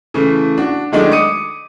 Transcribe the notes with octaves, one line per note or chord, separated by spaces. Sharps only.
C#3 E3 A3
D4 F#4
D#3 F#3 G#3 A3 D4 D#4
D6 D#6 C#7 D#7